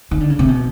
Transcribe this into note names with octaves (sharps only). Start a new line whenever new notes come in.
D#3
D3
C#3
C3
B2